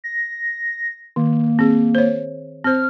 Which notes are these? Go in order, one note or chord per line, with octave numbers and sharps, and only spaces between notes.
A#6
D#3 A#3
C4 G#4
C5 C#5
C4 C5 F6